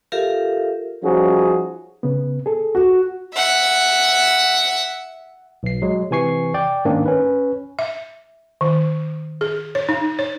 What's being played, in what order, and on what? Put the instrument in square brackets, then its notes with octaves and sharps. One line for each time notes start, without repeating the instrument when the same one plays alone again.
[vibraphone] F4 G4 A4 A#4 E5 F5
[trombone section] F3 G3 C#4 D#4 F#4 G#4
[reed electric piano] C#3 B3
G#4 A4
[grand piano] F#4
[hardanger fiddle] E5 F#5
[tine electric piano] B1 C7
F#3 G#3
C3 E3 G#5 C#6 C7
D5 G5
G#2 D#3 A#3 C#4 D4
C#4 B4
[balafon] E5
D#3
G#4
C#5
D#4
C#5